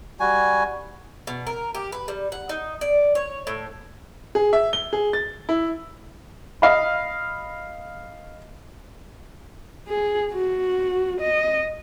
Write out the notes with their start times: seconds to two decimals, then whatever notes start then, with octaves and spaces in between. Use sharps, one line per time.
0.20 G3 F#4 G#5
1.27 B2
1.47 A#4
1.75 G4
1.92 B4
2.08 G3
2.32 F#5
2.49 D#4
2.81 D5
3.15 C#5
3.47 A2
4.35 G#4
4.53 E5
4.73 G7
4.93 G#4
5.13 A6
5.49 E4
6.62 D#5 F5 B5
9.88 G#4
10.33 F#4
11.21 D#5